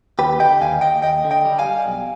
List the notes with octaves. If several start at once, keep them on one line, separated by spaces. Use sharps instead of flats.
D#2 G4 B4
D3 D#5 G5
D#2 F5 G#5
D#2 D#5 G5
D#2 D#5 G5
D3
D#5 G5
G3
F5 G#5
G3
B1